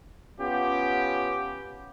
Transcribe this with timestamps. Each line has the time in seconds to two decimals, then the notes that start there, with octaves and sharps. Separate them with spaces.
0.39 B3 C#4 F4 G4